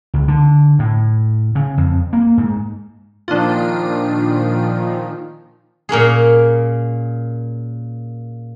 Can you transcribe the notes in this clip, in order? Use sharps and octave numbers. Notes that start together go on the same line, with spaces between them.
C#2
D3
A2
C#3
F2
A#3
G#2
A#2 D#3 F3 D4 F4
A#2 A#3 C#4 G#4